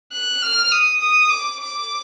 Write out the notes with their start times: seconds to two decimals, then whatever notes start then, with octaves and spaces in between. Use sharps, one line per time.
0.12 F#6
0.42 F6
0.72 D#6
1.00 D#6
1.29 D6
1.60 D6